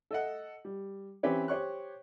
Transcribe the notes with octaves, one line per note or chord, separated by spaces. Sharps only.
A4 D#5 F#5
G3
E3 C4 C#4 G4 B4 C#5
G4 C5 C#5 C#6 F#6